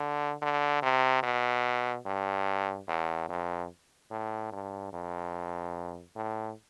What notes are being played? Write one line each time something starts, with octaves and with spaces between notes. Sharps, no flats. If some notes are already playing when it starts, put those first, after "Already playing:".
Already playing: D3
D3
C3
B2
G2
E2
F2
A2
G2
F2
A2